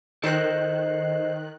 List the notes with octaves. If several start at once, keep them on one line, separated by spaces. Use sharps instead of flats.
D#3 A4 C5 D#5 F#6